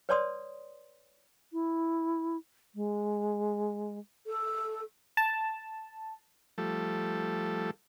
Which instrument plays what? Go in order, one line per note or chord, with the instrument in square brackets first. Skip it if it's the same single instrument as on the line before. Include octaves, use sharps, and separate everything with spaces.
[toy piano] B4 C#5 D5 A5 C6 D#6
[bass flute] E4
G#3
A4
[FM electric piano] A5
[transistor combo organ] F3 G3 A3 A4